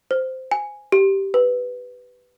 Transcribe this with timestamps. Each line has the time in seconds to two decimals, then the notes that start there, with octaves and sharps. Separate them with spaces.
0.11 C5
0.51 G#5
0.92 G4
1.34 B4